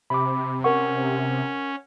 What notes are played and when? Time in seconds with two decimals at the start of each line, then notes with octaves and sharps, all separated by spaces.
0.10 C3 B5 D6
0.64 C#4 A#4 F#5 C#6